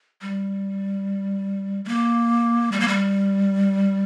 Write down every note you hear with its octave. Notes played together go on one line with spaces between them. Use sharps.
G3
G3
A#3
G3
A#3
G3